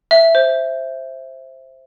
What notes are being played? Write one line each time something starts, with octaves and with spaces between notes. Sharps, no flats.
E5
C5